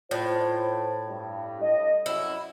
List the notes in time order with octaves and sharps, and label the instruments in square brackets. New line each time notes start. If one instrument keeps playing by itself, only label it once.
[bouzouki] A2 [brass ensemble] F4 C5
[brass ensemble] G2
D#5
[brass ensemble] F#2 [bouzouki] E4